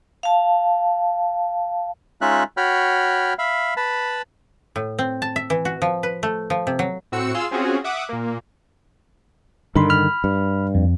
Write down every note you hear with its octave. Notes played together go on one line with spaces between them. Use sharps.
F5 A5
G#3 C#4 D#4 F4 E5 F#6
F#4 C#5 G5 B5 F6
E5 F5 B5
B4 A5 B5
A2
C4
A5
E5
E3
F#4
F3
B4
A3
F3
C3
F#3
A2 C4 F#4 E6 C#7
F4 G#4 F5 C6 E6
C4 C#4 F4 F#4 G#4
E5 F#5 D6 D#6
A#2 A#3
G2 D3 D#3 A#4 B5 C6
B5 F6
G2
F2